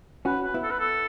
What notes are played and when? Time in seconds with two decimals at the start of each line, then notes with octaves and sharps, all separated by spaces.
0.25 C#4 F#4 B4
0.45 B4
0.54 B3 E4
0.63 A4
0.71 B4
0.80 A4